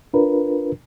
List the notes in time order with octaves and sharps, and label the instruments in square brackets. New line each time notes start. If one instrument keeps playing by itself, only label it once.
[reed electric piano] D4 F4 A#4 B4